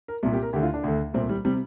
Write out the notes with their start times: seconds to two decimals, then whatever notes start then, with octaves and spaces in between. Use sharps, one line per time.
0.08 A#4
0.23 C2 A#2
0.33 G4
0.43 A#4
0.53 D2 D3 G4
0.63 F4
0.74 D4
0.84 D2 D3
1.14 C2 A#2 C4
1.29 G3
1.45 C3 G3